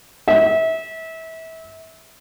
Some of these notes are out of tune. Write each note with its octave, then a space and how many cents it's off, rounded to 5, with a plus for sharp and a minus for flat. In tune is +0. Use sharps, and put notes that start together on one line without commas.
E5 -30